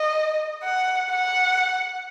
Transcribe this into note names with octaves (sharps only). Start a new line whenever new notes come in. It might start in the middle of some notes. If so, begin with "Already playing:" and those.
Already playing: D#5
F#5
F#5